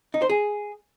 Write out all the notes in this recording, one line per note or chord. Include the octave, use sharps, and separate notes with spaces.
D#4
C5
G#4